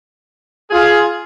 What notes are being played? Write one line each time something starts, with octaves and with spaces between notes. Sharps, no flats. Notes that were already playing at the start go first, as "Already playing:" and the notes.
F4 G#4